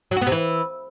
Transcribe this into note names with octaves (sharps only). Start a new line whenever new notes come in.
F#3
F#4
B3
C3
E3